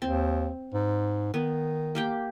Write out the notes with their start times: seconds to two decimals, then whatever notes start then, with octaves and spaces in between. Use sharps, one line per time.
0.02 D#2 C4
0.74 G#2
1.34 D#3 B3
1.95 A#3 G4 G5